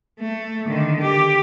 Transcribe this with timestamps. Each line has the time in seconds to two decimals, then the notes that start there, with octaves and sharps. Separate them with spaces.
0.19 A3
0.66 D3 D#3
1.01 G4